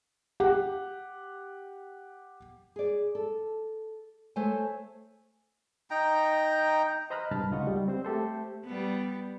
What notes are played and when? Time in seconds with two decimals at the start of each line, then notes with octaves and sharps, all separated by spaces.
0.40 G4 F#5
2.76 G#4 D5
3.15 A4
4.36 A3 A4 C5 C#5 G#5
5.91 D#4 G5 A#5
7.10 C5 D#5 A#5 B5 F6 F#6
7.31 C2 G2 A5 B5 F6
7.51 C#2 D#4 F4 D#5 F#5 C#6
7.67 G3
7.88 C4 C5
8.05 A3 G4 A4 C5
8.65 G3 B3